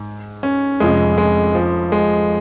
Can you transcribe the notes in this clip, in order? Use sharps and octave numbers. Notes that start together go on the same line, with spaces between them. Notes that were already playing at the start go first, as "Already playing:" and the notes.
Already playing: G#2
C#4
F1 F2 F3 G#3 C#4
G#3
F3
G#3